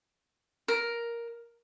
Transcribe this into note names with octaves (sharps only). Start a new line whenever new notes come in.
A#4